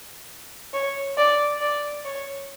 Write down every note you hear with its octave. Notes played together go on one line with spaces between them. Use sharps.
C#5
D5
D5
C#5